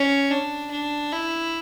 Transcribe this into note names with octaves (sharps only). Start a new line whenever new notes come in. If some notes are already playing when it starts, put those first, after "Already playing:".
Already playing: C#4
D4
D4
E4